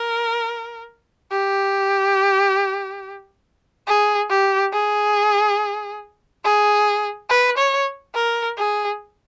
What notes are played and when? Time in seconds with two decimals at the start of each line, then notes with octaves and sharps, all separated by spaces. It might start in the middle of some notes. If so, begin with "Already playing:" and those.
Already playing: A#4
1.31 G4
3.87 G#4
4.29 G4
4.73 G#4
6.44 G#4
7.30 B4
7.57 C#5
8.15 A#4
8.57 G#4